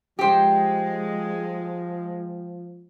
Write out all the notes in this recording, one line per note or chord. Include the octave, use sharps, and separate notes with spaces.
F3 G#3 G4 C5